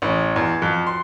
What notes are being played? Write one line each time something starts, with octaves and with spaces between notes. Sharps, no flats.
A1
E2
F2
C6